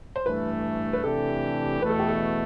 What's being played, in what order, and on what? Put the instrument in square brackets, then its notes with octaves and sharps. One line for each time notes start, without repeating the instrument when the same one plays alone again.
[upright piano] C5
[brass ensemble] G2 E3 A3 [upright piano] B4
[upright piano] B4
[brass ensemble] C3 E3 A3 D4 G4 [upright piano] A4
[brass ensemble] E2 B2 A3 [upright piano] B4
[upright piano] A4
G4
A4